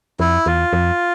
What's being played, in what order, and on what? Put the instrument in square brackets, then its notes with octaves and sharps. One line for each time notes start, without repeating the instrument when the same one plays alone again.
[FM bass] F2 [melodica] E4
[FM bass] E2 [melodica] F4
[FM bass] F2